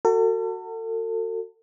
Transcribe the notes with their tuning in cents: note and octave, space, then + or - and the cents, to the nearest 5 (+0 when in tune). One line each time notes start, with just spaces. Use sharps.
F#4 +0 A4 +40